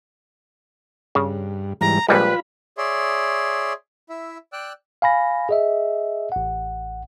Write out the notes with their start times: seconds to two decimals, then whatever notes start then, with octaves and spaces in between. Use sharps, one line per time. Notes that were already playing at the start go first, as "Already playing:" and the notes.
1.15 G2 C#3
1.81 G#2 E3 G3 A#5
2.08 A#1 G3 G#3 F4 B4 B5
2.78 G#4 C#5 D5 E5 C6
4.09 E4 E5
4.53 D5 G5 E6 F#6
5.02 F5 G#5 B5 A#6
5.49 G#4 D#5 E5
6.32 A1 F#5